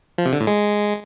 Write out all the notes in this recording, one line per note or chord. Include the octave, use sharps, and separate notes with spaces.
F3
C3
D3
A2
G#3